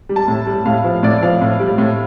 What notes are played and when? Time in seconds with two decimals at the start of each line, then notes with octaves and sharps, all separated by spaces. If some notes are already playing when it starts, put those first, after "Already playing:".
0.09 G3
0.16 A5
0.28 A2
0.47 G3
0.66 A2 F5
0.84 F3
1.03 A2 D5
1.22 F3 F5
1.41 A2
1.60 G3
1.78 A2